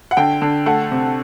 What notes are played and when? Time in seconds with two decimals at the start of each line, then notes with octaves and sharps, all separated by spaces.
0.11 F#5
0.17 D3 G5
0.42 D3
0.66 A3 F#5
0.91 C3